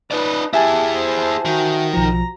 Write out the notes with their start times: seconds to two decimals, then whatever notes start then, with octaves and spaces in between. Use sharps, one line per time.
0.11 D#4 B4 D5
0.53 E4 G4 G#4 E5 G#5 A5
0.95 C5
1.46 D#3 F#4
1.94 B1 F3 A#5